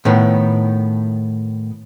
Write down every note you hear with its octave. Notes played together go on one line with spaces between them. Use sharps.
A2 D#3 B3